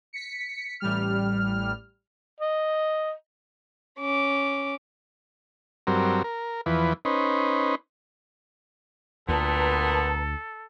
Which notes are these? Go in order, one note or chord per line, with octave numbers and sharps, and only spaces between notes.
B6 C#7
A1 G3 F6
D#5
C#4 D6
G2 F#3 C4 A#4
A#4
E2 E3 F3 B4
C#4 D#4 B4 C5
D2 A#2 B3 A4 B4 A5 A#5